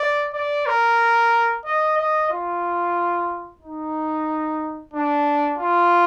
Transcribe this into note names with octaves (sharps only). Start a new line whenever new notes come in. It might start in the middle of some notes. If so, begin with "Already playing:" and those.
Already playing: D5
D5
A#4
D#5
D#5
F4
D#4
D4
F4